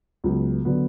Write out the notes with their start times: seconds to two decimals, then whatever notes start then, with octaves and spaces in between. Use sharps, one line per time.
0.24 C#2 C#3 F#3 B3
0.65 D3 F#3 B3